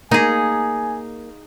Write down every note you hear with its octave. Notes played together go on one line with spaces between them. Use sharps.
A#3 D#4 G#4 G#5